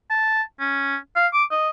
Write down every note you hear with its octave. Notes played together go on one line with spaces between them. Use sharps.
A5
C#4
F5
D6
D#5